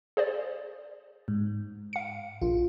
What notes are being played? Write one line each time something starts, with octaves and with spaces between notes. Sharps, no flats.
G#4 C5 D5
G#2
F5 C#7
A#1 F4